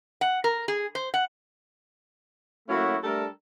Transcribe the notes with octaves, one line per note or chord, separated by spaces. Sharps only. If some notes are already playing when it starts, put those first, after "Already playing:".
F#5
A#4
G#4
C5
F#5
F#3 A3 A#3 C#4 E4 F#4
G3 A3 D4 A4 A#4